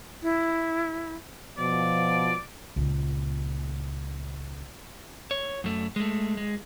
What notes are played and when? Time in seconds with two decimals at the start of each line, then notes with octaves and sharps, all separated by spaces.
0.23 E4
1.58 B2 F3 D5
2.76 C#2 A#2
5.31 C#5
5.64 F#2 A3
5.96 G#3 A3
6.37 G#3